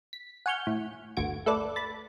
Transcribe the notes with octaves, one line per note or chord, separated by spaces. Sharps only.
B6
F#5 G#5 C#6 F6 G6
A2
G1 D2 F#4 G#6 D7
A3 A4 B4 D5
B5 A6